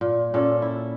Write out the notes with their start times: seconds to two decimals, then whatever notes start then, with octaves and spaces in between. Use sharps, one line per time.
0.01 A#2
0.34 A#2 C#4 A4 D5
0.62 E4